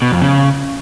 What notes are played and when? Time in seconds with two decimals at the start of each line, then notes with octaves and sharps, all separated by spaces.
0.02 B2
0.12 F2
0.22 C#3